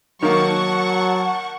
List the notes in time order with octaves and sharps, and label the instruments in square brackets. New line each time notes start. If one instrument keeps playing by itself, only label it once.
[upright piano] D#3 A#3 [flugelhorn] F#3 [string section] F#5 A5 C#6